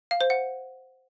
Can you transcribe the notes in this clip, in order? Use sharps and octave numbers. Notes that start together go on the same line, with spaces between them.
F5
C5
F#5